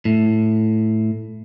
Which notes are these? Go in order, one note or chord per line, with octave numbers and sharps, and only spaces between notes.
A2